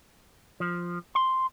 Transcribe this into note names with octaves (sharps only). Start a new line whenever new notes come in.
F3
C6